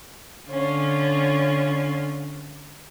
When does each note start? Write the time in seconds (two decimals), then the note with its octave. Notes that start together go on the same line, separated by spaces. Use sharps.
0.49 D3 C#4 F4